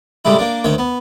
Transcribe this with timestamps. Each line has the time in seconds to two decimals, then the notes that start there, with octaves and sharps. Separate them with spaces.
0.25 A2 C#3 G3 G#3 E4
0.38 A#3 D4
0.64 D2 D#3 C#5
0.78 B3